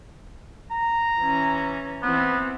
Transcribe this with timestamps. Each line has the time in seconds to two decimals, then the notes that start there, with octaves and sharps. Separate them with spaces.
0.71 A#5
1.20 E3 C#4
2.03 E3 B3 C4